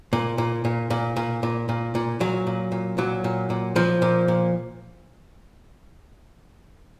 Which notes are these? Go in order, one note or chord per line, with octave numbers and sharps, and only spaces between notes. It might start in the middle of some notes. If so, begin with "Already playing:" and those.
A#2
A#2
A#2
A#2
A#2
A#2
A#2
A#2
A#2 F#3
A#2
A#2
A#2 F#3
A#2
A#2
A#2 F3
A#2
A#2